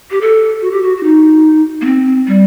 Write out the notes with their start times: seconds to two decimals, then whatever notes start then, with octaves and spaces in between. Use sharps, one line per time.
0.11 G4
0.21 A4
0.61 F#4
0.71 G4
0.82 F#4
0.97 F#4
1.03 D#4
1.81 A#3
1.85 C4
2.27 G3